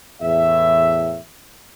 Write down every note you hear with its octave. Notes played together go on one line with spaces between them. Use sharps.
E2 A2 E5